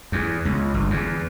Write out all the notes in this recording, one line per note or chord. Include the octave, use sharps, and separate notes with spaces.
E2
C#2
G1
E2